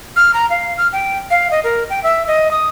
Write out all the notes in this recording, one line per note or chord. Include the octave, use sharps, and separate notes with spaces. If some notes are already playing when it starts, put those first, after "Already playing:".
F6
A#5
F5
F6
G5
F5
D#5
A#4
G5
E5
D#5
D#6